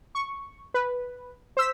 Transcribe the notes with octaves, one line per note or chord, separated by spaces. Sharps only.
C#6
B4
C5 E6 B6